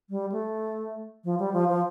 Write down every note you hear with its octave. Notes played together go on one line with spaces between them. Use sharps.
G3
A3
F3
G3
F3
F3